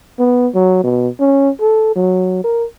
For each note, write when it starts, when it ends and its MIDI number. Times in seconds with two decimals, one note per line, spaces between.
0.19 0.48 59
0.54 0.80 54
0.84 1.09 47
1.20 1.50 61
1.61 1.92 69
1.96 2.41 54
2.44 2.65 70